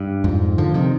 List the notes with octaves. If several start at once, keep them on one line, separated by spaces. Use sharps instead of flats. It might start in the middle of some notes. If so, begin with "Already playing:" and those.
Already playing: G2
F2 G#2
D3 F3
C3 D#3